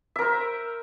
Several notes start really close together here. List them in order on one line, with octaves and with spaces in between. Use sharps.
E5 A#4 C5